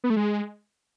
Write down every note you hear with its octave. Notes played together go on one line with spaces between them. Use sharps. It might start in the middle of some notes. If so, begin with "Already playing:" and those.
B3
A3
G#3